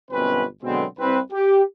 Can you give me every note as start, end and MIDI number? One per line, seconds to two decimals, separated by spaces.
0.11 0.45 31
0.11 0.45 42
0.11 0.45 47
0.11 0.45 60
0.11 0.45 61
0.11 0.45 71
0.63 0.85 47
0.63 0.85 50
0.63 0.85 54
0.63 0.85 56
0.63 0.85 59
0.63 0.85 60
0.99 1.19 36
0.99 1.19 60
0.99 1.19 71
1.32 1.62 67